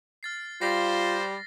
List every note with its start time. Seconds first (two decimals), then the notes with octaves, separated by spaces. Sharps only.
0.23 F6 A6 C7
0.61 G3 F4 C5 A#6 C7